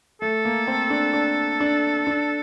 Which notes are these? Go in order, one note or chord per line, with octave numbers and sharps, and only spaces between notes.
A3 A4
A#3
C4
D4
D4
D4
D4